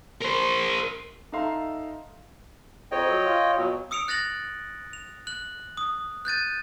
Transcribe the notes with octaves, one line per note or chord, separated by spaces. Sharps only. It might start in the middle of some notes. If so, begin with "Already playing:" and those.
A#4 C5
D#4 A4 E5 F5 A#5 C6
F2 C#5 D#5 G5
F#3
F4
B2 F#3
D#6 E6 C#7 D7 F7
F#6 A6 A#6 F7 F#7
F7
F#6 F#7
D#6
F#6 G6 A6 D#7